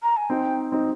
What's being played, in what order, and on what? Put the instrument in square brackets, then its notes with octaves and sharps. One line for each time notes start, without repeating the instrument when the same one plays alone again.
[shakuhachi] A#5
G#5
[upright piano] C4 D#4 [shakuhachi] G5
[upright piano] C4 D#4